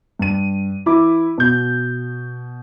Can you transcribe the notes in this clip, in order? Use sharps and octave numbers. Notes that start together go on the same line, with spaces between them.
G2 D#7
E3 E4 B5 D6
B2 G6